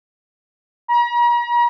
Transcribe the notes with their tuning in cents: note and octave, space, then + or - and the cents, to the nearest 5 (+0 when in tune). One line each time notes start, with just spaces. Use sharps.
A#5 +40